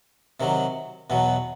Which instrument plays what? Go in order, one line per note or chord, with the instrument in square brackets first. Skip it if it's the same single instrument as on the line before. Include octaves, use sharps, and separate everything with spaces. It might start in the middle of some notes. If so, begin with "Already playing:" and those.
[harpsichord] C3 D#3 F#3
E2 B2 F#3